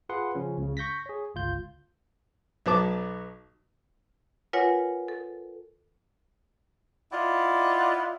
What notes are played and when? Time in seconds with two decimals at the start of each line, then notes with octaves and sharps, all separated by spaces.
0.09 F4 G#4 B4 F#5 C6
0.35 C#3 F3 C#4
0.58 C#2 C#3
0.77 C#6 G6 A#6 B6
1.06 G#4 C#5
1.35 G1 C#2 F4 G6
2.66 B1 F#3 B3 A5 D6
4.53 F4 A#4 B4 C#5 F#5 G#5
5.08 A4
7.12 E4 F4 D5 D#5 F#5